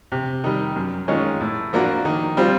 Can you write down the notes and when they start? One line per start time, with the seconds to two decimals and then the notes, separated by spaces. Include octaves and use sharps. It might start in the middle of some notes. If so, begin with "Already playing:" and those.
0.12 C3
0.44 D#3 G3
0.76 F#2
1.08 D#3 G#3 C#4 F4
1.41 A2
1.73 F3 A#3 D4 F#4
2.05 D#3
2.37 G3 C4 F4